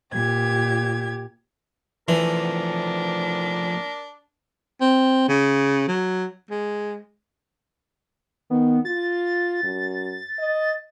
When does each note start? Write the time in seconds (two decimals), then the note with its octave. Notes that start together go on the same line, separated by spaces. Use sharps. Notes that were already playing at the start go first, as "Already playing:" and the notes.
0.13 A#2 G4 G#6
2.08 E3 F3 A3 D4 A#4
4.81 C4
5.28 C#3
5.88 F#3
6.50 G#3
8.50 D#3 B3
8.85 F4 A6
9.63 F#2
10.39 D#5